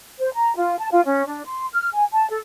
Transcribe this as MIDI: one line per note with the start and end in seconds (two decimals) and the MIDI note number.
0.19 0.32 72
0.35 0.53 82
0.57 0.78 65
0.79 0.89 81
0.92 1.04 65
1.05 1.25 61
1.27 1.44 62
1.46 1.65 84
1.73 1.88 89
1.94 2.05 80
2.11 2.30 81
2.30 2.38 69